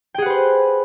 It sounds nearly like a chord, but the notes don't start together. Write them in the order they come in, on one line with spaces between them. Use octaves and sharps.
G5 G#4 F#5 B4 C5